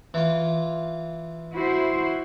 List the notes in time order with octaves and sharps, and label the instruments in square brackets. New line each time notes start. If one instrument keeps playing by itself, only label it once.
[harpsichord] E3 F4
[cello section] E4 F#4 C5